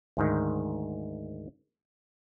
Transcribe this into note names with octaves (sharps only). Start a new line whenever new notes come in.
D2 G#2 D#3